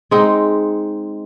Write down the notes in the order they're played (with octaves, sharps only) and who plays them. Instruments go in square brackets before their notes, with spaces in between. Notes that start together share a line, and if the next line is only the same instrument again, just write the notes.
[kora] G#3 C4 D#4